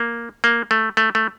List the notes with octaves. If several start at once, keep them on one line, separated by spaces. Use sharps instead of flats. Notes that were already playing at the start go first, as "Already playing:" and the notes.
Already playing: A#3
A#3
A3
A3
A3